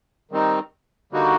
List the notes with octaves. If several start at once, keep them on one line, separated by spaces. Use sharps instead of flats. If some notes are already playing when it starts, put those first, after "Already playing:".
D#3 G3 C4 D#4
D3 G3 A#3 D#4 F#4